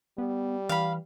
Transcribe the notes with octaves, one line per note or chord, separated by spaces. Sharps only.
G3 B3
E3 F5 B5